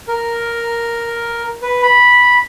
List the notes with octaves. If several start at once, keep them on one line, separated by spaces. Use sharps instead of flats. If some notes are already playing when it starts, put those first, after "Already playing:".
A#4
B4
B5